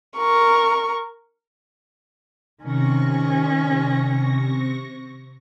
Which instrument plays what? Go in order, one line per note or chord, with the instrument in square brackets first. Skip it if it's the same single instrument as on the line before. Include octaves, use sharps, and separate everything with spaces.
[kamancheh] A#4 C#6
[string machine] C3 C#6 A#6 [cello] D#3 C#4